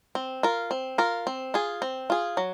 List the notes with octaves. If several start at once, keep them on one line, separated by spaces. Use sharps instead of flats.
C4
F4 A#4
C4
F4 A#4
C4
F4 G#4
C4
F4 G#4
F#3